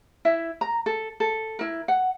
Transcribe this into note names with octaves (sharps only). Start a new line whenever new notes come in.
E4 E5
A#5
A4
A4
E4 A#4
F#5